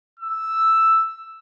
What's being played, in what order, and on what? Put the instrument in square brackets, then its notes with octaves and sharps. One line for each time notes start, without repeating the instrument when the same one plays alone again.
[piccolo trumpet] E6